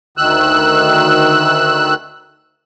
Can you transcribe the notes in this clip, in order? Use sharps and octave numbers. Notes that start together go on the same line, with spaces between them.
D2 D#3 E6 F#6